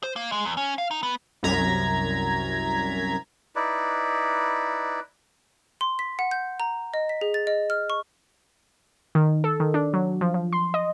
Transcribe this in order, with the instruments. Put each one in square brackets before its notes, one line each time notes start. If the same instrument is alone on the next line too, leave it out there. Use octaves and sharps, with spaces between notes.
[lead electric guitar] C5
A#3
G#3
E2
C#4
F5
D#4
B3
[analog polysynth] C2 F#2 A#5 G#6 B6
[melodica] D#4 E4 B4 D5
[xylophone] C6
B6
F#5
G6
A#5
D#5
B6
G#4
A6
D#5
F6
C#6
[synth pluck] D#3
A4
D#3
D4
F#3
F3
F3
C6
D#5